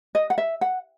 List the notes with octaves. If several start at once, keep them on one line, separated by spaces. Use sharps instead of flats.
D#5
F#5
E5
F#5